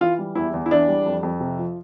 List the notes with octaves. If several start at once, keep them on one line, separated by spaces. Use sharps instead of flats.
E3 F4
G3
E2 E4
E2
E4
E3 D4
G3
F2
F2
C3
F3